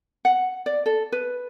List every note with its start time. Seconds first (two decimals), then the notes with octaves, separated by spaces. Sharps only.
0.25 F#5
0.66 D5
0.86 A4
1.12 B4